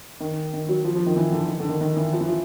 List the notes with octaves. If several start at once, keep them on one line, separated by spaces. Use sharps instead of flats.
D#3
D#3
F#3
F3
F3
D#3
E3
D3
D#3
D3
D#3
D#3
E3
F3
E3
F3